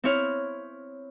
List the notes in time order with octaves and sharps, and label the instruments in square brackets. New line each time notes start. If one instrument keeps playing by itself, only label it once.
[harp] C4 E4 C#5 F6